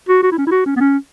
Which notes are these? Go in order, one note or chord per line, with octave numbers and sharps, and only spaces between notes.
F#4
F#4
E4
C#4
E4
F#4
C#4
B3
C#4